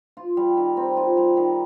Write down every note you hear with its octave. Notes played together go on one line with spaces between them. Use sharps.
F4
G3
D#3
C4
F4
G3
D#3